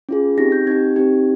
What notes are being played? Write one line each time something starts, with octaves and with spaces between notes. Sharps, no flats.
C#4 F4 G#4
C4 D#4 G4 A#6
G6
C4 D#4 G4 G#6
C4 D#4 G4 G#6